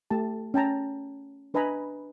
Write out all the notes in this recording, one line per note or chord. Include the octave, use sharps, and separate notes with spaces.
A3 G4 A5
C#4 G5 A5 A#5
D4 B4 D#5 G#5 A#5 B5